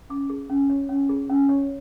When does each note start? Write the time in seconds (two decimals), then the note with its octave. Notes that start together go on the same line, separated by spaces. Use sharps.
0.10 C#4 D6
0.30 G#4
0.50 C#4
0.70 C#5
0.89 C#4
1.09 G#4
1.29 C#4
1.49 C#5